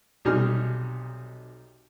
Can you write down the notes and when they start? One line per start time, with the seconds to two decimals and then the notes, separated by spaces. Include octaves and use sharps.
0.25 B1 C3 G3 D#4 G#5 F6